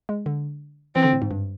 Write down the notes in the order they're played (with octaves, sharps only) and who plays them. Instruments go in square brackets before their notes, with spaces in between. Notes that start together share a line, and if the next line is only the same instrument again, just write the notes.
[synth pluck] G#3
D3
[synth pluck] E3 [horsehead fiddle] C4
[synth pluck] D3
A2
G#2
G2